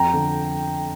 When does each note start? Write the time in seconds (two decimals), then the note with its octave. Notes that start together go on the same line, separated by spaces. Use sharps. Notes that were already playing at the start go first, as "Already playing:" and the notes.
Already playing: F2 G5 A#5
0.14 D3